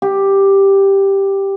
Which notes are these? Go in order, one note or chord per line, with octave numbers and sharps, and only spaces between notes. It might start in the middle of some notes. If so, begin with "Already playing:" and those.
G4